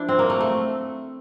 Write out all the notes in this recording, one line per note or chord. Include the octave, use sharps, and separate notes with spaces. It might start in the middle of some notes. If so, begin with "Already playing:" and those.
Already playing: F3 D4 E4
C4
A#3
A3
A3